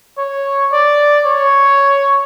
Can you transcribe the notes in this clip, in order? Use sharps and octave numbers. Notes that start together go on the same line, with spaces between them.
C#5
D5
C#5